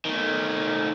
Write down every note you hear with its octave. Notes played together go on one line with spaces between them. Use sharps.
D#3 A3